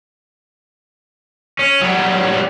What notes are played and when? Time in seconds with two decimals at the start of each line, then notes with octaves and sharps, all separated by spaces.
1.59 C#4
1.81 F#3 G3